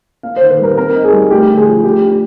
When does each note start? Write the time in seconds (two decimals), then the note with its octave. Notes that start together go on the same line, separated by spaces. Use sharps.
0.23 A#3 F5
0.36 C5
0.41 D#3
0.50 B4
0.59 G3 A#4
0.77 C4 A#4
0.95 D#4
1.04 G#4
1.13 G3
1.31 A3 G4
1.49 D3
1.57 G#4
1.66 F3
1.84 A3 G4
2.02 D4 G4